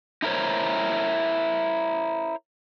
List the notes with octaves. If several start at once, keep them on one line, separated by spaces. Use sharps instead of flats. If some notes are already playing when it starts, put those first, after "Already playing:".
D#4 E4 A#4 C5 C#5